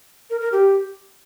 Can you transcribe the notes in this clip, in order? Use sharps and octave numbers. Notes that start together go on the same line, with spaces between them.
A#4
A#4
G4